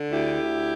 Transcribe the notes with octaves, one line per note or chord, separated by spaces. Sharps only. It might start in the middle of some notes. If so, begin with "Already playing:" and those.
Already playing: D3
D2 E4 G4
D2